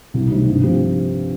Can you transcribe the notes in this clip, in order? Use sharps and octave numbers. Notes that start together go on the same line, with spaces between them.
C2
C3 D#3 G3
G2
F3 C4 G4